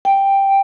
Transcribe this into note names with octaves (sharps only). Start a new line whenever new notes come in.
G5